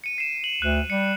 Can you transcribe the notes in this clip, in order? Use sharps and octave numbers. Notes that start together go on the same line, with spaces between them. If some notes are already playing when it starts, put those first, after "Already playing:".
C#7 D#7
C7 E7
F#7
D2 F#6
G3 C#7